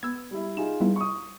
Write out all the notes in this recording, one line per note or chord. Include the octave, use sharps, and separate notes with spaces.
B3 E6 G#6
G3 E4
D#4 F4 G#4 E7
G3 B3 E4
C#6 D#6